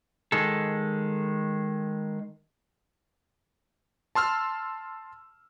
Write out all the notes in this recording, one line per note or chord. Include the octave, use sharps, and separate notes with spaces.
D#3 G#3 A4
A5 C6 E6 F6